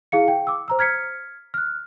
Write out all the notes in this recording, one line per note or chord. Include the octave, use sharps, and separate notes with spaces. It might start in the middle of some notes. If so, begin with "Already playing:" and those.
E4 G#4 F5 C#7
G5
D6 E6
C5 A#5 E6
F6 G#6 B6 C#7
F6 F#6